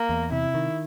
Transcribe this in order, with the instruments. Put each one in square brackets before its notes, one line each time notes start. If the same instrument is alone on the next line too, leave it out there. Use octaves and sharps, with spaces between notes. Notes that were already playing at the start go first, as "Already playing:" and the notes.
Already playing: [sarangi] A#3
[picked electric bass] E2
[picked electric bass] C3 [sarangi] E4
[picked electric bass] D#3